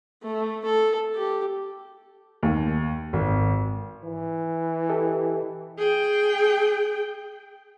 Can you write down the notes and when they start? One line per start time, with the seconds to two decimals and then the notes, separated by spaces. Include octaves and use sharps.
0.23 A3
0.65 A4
1.15 G4
2.43 D#2
3.13 G#1
4.04 E3
4.89 G4 A4 D#5
5.78 G#4 G5